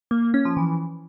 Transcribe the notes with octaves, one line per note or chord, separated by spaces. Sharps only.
A#3
A#3
C#4
F3
E3